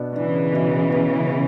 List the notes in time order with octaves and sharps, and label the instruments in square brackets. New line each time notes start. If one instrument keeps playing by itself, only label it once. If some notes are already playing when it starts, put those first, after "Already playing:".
Already playing: [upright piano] B2 B3 D4
[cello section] C#3 E3 [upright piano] D4
[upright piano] B2
B3
B3